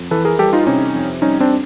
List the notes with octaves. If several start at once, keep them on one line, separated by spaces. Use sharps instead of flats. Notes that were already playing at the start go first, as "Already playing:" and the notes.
Already playing: F2
E3 A4 B4
G#4 A#4
G3 G4 A4
D#4 F4
C3 C#4 D#4
F2
G3 C#4 D#4
C4 D4